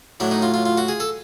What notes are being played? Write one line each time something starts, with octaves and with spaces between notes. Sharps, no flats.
A2 F#3 D4
D#4
F4
F4
F4
F#4
G#4
A4